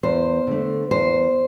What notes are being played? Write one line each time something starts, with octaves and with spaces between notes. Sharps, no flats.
E2 C5
D3 A3
E2 C5